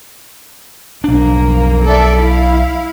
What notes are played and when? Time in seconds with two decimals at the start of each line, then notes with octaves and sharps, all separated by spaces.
1.04 B1 F2 A#3 D4
1.85 A4 D5 E5
2.19 E4 F5